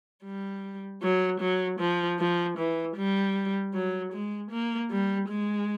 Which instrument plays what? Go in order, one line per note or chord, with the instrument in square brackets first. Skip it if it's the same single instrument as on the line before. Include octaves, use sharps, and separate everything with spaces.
[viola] G3
F#3
F#3
F3
F3
E3
G3
F#3
G#3
A#3
G3
G#3